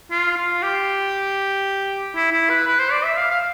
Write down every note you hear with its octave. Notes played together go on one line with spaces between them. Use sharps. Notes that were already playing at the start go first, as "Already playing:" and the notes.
F4
F4
G4
E4
E4
B4
B4
C5
D5
E5
F5
F5